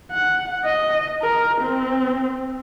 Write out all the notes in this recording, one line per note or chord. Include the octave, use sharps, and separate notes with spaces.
F#5
D#5
A#4
C4